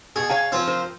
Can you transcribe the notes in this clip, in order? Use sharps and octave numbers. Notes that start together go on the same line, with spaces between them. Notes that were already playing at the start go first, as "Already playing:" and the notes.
B2 G#4
C#5 F5 G#5
F3 C4
A#4 C5